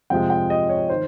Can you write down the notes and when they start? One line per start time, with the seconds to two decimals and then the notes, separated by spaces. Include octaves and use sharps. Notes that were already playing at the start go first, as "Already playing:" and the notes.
0.10 F2 C3 F3 G#3 G5
0.30 G5
0.50 D#5
0.69 C#5
0.90 D#3 C5